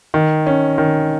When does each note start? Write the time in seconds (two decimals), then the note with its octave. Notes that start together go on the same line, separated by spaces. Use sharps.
0.14 D#3
0.47 C#4
0.78 D#3